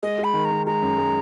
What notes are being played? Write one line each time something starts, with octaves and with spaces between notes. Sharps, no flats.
G#3 D#5
G#3
B5
D#3
A#5
D#3
G#3 A#5
F#2
G#3